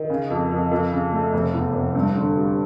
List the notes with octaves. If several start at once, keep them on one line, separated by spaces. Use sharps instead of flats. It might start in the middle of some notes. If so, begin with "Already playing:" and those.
Already playing: D#3
C#3
F2
F2
F2
C#3
A3
F1
E2
F1
G2
D3
G3